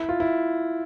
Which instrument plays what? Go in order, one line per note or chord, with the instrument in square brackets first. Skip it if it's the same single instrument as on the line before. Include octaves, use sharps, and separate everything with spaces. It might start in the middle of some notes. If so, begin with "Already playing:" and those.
Already playing: [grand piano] E4
F4
E4